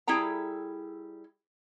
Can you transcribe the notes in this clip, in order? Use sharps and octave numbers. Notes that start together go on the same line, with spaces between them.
G3 E4 G#4 A4 G5 A#5